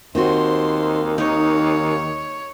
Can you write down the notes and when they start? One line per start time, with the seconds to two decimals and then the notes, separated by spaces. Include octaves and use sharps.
0.15 D#2 D#3 C4 F#4 C5 C6
1.18 D#4 C#5